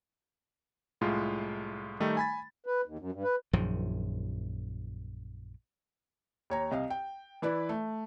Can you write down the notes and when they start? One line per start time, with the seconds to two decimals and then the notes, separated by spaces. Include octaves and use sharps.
1.01 C2 A2 G#3 F4
2.00 D#3 G3 A3 D#4
2.17 G#5 B5 A6
2.66 B4
2.85 D#2
2.99 F#2
3.12 G2
3.24 B4
3.53 A#1 F#2 D#3 F3
6.50 D#2 C#5 A#5
6.71 C2 D#5 F5
6.90 G5
7.42 E3 E4 B4 D5
7.69 A3